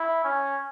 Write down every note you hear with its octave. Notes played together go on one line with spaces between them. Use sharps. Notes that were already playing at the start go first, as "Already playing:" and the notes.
Already playing: E4
C#4